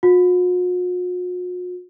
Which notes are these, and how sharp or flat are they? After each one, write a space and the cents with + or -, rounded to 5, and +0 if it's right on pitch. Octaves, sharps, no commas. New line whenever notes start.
F#4 -45